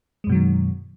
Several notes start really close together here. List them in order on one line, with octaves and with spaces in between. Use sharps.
G#3 F#2 B2 F#3 D#3